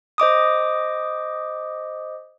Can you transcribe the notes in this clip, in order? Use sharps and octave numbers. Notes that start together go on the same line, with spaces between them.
C5 D#5 D6 D#6